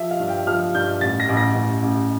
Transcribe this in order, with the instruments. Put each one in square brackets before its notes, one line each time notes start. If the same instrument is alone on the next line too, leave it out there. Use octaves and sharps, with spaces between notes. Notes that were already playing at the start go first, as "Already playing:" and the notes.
Already playing: [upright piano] F3 E5
F5
G2
G5
F3 F6
G2 G6
A1 A6
A#6
A1
A#6
A1
A1